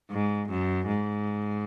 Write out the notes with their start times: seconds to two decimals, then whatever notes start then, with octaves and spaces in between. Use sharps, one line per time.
0.11 G#2
0.49 F#2
0.87 G#2